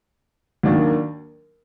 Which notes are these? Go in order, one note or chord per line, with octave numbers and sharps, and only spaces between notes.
D#2 D#3 F#3 A#3 D4